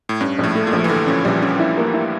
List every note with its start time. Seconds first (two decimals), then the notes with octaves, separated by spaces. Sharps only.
0.09 A2
0.21 G2 C#4
0.39 A#1 A2
0.55 A3
0.67 A#2
0.73 A#1
0.84 E3
0.89 D3 A3
1.07 F3 C#4
1.25 A#1 G3
1.42 F3 C#4
1.59 E4
1.77 A#3
1.94 E4